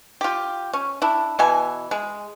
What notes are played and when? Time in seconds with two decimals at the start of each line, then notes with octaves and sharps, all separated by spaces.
0.21 F4 G4
0.73 C#4
1.02 D4 E4
1.39 B2 E3 G#5
1.91 G#3